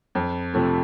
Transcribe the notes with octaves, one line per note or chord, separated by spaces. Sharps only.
F2
C3 F3 A3